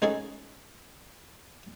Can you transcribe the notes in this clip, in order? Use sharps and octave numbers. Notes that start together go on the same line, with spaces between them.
G#3 C#4 D#4 G#4 A4 D#5